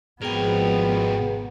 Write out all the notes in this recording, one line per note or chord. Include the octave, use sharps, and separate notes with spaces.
G#1 B2 F3 B3 G#4 A#4 G5